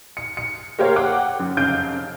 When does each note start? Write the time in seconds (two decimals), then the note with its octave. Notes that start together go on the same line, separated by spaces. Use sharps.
0.17 C#7
0.37 C#7
0.79 A#3 G4 A#4 C5 C#5 F5
0.96 F#5 G5 D6 F#6
1.39 F#2
1.57 F1 C#3 F5 G6 D7